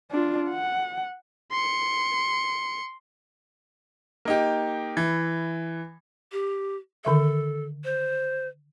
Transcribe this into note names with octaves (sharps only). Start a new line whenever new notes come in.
D4 F4
F#5
C6 C#7
A#3 D#4 G4
E3
G4
D3 D#3 A4 E5
C5